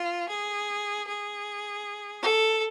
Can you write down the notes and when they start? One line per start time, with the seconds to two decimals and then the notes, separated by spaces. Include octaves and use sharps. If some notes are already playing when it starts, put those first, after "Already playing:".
Already playing: F4
0.29 G#4
1.07 G#4
2.23 A4